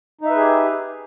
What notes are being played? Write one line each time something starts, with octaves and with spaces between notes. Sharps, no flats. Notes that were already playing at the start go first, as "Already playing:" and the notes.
D#4 G4 G#4 B4 E5